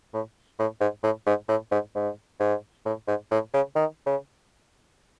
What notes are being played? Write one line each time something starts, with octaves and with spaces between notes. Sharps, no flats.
A2
A2
G#2
A2
G#2
A2
G#2
G#2
G#2
A2
G#2
A2
C#3
D#3
C#3